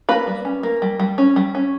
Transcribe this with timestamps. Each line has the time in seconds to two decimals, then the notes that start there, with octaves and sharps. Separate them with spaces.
0.09 A#3 B4 B5
0.27 G3
0.45 C#4
0.63 A#3
0.82 G3
1.00 G3
1.18 C#4
1.36 G3
1.55 C#4